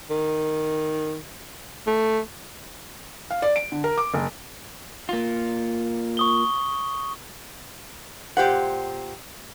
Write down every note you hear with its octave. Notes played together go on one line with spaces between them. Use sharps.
D#3
A3
F5
D5
D7
D3
A#4
D6
F#1
A#3 F4
C#6 D#6 G7
A#2 G4 C5 F#5